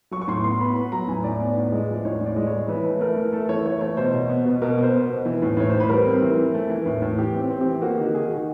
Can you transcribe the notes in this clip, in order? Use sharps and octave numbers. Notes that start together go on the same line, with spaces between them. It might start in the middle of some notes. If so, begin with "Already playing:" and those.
F#3 C#6
C#6
A2 C6
B3 C6
B3 B5
B3 B5
F#3 A#5
A2 G#5
A2 D5
B3
A2
G#3
F3 D5
A2 C#5
A2 D5
G#3
C#5
G#3
E3 B4
A3
A3 A#4
E3
A3 A4
E3 C#5
E3 C#5
A3 C#5
B2 C5
B2
B3
B2
B2 A#4
B3
C5
B3
B2
E3
A2
A2 C#5
A2 C5
B4
G3 A#4
C4
E3
E3
A3
E3
A2
A2
E3 G4
C4
C4
E3 G4
A#3 F#4
D#3 G4
D#3 G#4
D#3 F#4